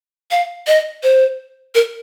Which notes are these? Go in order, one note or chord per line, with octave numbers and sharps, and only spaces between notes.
F5
D#5
C5
A#4